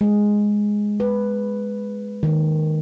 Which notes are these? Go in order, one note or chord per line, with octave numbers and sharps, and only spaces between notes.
G#3
B4
D#3